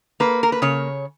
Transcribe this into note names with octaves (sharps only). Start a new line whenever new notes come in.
A#3 B4
A#4
B4
C#3 C#5